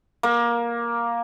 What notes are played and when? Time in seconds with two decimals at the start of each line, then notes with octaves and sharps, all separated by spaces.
0.23 A#3